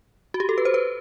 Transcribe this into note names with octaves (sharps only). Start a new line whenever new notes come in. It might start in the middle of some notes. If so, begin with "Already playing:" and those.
F#4
G4
A4
B4
C5
B4